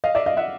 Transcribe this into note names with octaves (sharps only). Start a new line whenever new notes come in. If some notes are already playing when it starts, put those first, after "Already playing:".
D#5 F5
D5 E5
D#5 F5
E5 F#5